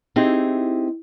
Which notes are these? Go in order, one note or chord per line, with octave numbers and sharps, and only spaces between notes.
C4 D#4 E4 G4 G#4